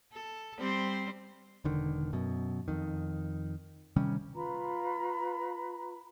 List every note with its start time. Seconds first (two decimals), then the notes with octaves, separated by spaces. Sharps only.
0.13 A4
0.59 G3 C4 C5
1.65 E1 D3 D#3
2.13 F#2 B2
2.68 F2 D#3
3.96 C3 D#3 G3 C#4
4.35 F4 B4 A#5 B5